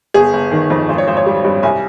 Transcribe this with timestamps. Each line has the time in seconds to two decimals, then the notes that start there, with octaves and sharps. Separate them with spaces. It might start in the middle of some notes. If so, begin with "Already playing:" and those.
0.14 G1 G#4
0.33 G1
0.52 D#3
0.70 F2
0.89 G#1 C5
0.98 C#5
1.07 G#1 C5
1.17 C#5
1.26 G3
1.45 G2
1.63 C2 G#5